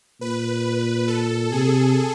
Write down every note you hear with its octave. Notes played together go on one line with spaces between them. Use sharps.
A#2 B4
A4
C3 G#4